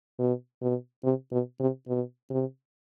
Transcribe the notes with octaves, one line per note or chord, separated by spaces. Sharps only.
B2
B2
C3
B2
C3
B2
C3